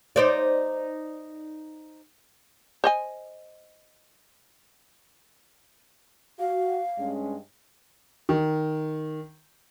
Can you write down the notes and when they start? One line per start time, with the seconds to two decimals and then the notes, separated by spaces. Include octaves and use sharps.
0.16 D#4 C5 D5
2.84 C5 D#5 G#5
6.39 F#4 F5
6.98 G2 G#3 C#4
8.29 D#3